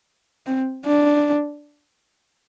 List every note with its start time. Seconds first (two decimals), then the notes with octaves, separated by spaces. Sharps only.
0.47 C4
0.86 D4